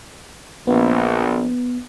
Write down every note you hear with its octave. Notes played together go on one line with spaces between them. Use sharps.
A#1 B3